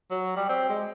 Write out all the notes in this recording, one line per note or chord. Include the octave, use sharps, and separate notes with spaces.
F#3
G3
C4
G#3